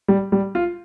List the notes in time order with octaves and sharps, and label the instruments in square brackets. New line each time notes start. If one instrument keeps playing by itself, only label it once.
[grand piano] G3
G3
F4